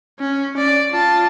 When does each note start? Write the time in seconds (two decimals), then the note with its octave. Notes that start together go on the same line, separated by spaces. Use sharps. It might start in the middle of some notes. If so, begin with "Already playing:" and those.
0.19 C#4
0.57 D5
0.92 F4 A5